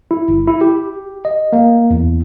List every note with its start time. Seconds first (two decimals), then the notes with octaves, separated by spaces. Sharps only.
0.11 E4
0.29 G1
0.47 E4
0.61 G4
1.25 D#5
1.53 A#3
1.90 E2